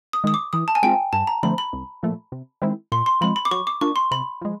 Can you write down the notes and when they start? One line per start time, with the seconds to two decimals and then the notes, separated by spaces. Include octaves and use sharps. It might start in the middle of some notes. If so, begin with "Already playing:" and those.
0.13 D#6
0.24 D#3 G#3 D#6
0.34 D6
0.53 E3 D#6
0.68 A5
0.75 G#5
0.83 G#3 C4 F4 G5
1.13 G2 A5
1.27 A#5
1.43 D3 F3 A3 C4 B5
1.58 B5
1.73 C2
2.03 A#2 F3 A3
2.32 C3
2.62 D#3 G#3 C4 E4
2.92 A#2 C6
3.06 C6
3.21 F3 G#3 C4 B5
3.36 B5
3.45 D6
3.51 F#3 C#6
3.67 D6
3.81 A#3 D4 F4 C#6
3.96 C6
4.11 C3 B5
4.41 F3 G#3